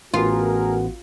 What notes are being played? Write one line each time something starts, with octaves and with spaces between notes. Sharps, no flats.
A1 A3 B3 F4 F#4 G#4 A#4